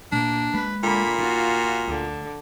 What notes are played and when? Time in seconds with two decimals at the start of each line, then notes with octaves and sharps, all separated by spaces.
0.12 A#2 A#3 D4
0.54 G#3 B4
0.83 A#2 D3 B5
1.19 D#4 F4 F#4
1.88 D2 D3